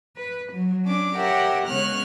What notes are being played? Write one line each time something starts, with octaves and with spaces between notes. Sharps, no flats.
B4
F#3
C#4 D4 D6
G4 A#4 C#5 E5 F#5 G5
C#3 G#3 B3 C#5 F6 F#6